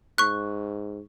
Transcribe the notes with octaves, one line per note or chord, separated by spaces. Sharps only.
G#2 C#6 F#6